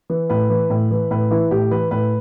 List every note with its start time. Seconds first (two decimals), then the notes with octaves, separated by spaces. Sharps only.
0.10 E3
0.30 A2 B4
0.50 E3
0.70 A2
0.91 E3
1.11 A2 B4
1.31 E3 E4
1.51 A2 G4
1.71 E3 B4
1.91 A2 B4